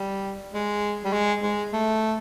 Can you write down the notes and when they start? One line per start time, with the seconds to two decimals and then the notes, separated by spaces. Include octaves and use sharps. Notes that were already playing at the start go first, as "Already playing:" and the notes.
Already playing: G3
0.53 G#3
1.05 G3
1.13 G#3
1.43 G#3
1.73 A3